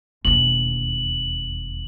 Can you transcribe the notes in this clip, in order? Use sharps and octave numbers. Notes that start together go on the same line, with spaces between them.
E1 D#2 F#7